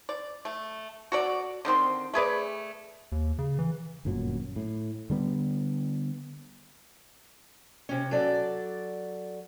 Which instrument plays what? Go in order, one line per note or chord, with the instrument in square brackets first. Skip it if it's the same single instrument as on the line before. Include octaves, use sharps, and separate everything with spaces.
[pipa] D5
A3
F#4 A4 D5
D3 D#3 C4 C6
A3 G#4 B4 D5
[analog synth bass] D#2
C#3
E3
[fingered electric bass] G1 F#2 A#2 F#3
A2
D3 G3 B3
[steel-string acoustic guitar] C3 C#4
F#3 A4 D5